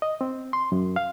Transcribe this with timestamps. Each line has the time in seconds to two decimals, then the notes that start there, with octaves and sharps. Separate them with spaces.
0.02 D#5
0.21 C4
0.53 C6
0.72 F#2
0.96 F5